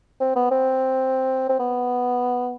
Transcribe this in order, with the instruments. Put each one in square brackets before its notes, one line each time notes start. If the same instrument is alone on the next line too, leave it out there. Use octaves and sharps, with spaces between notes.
[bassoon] C4
B3
C4
C4
B3